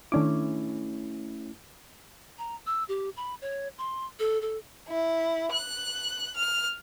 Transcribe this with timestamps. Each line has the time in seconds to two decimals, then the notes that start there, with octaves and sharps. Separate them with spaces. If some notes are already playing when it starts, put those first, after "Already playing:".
0.12 D#3 A3 C#4 D4 E4 D6
2.38 A#5
2.66 E6
2.89 G4
3.17 B5
3.42 C#5
3.78 C6
4.19 A4
4.42 A4
4.89 E4
5.52 F#6
6.37 F6